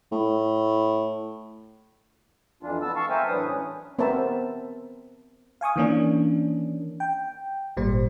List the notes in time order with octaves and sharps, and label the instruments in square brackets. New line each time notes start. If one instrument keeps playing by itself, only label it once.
[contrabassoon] A2
[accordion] F2 E3 D4 F4
B3 A5 E6
F5 A5 C#6
A#4 C5 E5 F5 G5 G#5
A2 E3 F#3 D4 B4 D#6
C#4
[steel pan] B3 C4 A#4 C5 E5 A5
[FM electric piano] F5 G#5 C#6 D#6
D#3 E3 A#3 C#4 D4
G5
G#1 A#2 G3 C5